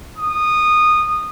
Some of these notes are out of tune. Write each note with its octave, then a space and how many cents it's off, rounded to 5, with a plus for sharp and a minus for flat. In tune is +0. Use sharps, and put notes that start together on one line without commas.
D#6 -15